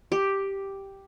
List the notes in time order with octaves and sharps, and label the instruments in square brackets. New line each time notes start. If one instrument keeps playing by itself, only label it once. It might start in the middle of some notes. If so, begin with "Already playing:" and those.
[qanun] G4